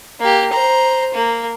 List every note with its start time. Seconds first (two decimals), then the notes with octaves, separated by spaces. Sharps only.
0.20 A#3 G4
0.52 C5 A#5
1.14 A#3